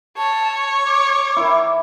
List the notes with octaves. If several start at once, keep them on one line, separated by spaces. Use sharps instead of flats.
C#5 A5
D6
D#3 E4